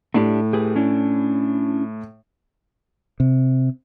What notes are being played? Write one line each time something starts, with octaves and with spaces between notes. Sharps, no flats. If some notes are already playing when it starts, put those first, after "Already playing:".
A2 A3 D4 G4
G4 G#4 B4
C#4 D4 E4
C3